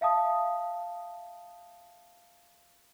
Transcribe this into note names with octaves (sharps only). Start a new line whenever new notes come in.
E5 F5 A5 D#6